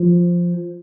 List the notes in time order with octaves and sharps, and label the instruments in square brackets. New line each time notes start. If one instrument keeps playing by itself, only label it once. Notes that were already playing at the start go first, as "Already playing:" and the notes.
Already playing: [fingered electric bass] F3